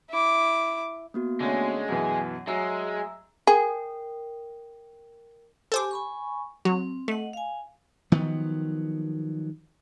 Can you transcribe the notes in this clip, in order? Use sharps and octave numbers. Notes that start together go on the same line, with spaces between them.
E4 D6
A#3 B3 F#4
D3 G#3 A3 C#4
F#2 B2 E3 F#5
F#3 G#3 E5 A#5 E6
G#4 A#4 G5
G4 A4 C5 G#5 D6
G#5 B5 C#6
F#3 C4
A3 D#5 F#5
F5 G#5
D#3 F3 F#3 B3